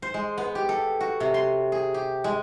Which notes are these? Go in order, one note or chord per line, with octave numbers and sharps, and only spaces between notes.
C5
G#3
B3
G4
A4
F#4
C3
C6
G#4
G4
G#3